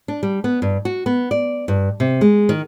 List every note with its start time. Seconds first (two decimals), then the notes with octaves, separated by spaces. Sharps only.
0.08 D4
0.23 G3
0.44 B3
0.62 G2
0.85 F#4
1.06 B3
1.31 D5
1.68 G2
2.00 C3
2.21 G#3
2.49 D#3